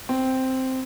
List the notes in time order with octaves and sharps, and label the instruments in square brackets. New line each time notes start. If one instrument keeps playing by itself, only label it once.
[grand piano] C4